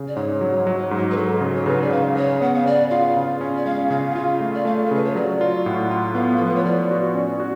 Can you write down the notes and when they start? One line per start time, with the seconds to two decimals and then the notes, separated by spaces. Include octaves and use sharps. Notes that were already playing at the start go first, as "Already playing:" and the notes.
Already playing: C#3
0.08 D5
0.16 G#2 C#5
0.41 F#3
0.67 F#3
0.91 G#2
1.11 B4
1.16 F#3 A4
1.41 C#3
1.55 C#5
1.66 C#3 B4
1.82 D5
1.91 C#3 F5
2.16 C#3 C#5
2.41 B3 F#5
2.55 F5
2.66 C#3 D5
2.90 F4 F5
3.17 C#3
3.41 C#4
3.57 D5
3.65 G#3 F5
3.90 C#3 F5
4.11 F#5
4.15 F4 F5
4.41 A3
4.54 D5
4.65 A3 F5
4.85 A4
4.91 C#3 B4
5.05 C#5
5.15 F#3 D5
5.41 F4
5.65 A2 F#5
5.91 F4
6.15 B3 F5
6.36 F3 A4
6.46 B4
6.56 C#5
6.65 F3 D5
6.91 F#4
7.15 C#4
7.40 F#4